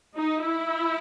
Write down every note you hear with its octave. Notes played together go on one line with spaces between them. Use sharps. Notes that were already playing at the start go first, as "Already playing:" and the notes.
D#4
E4